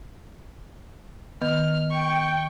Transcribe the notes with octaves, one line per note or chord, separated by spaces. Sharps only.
D#3 B3 F6
G5 C#6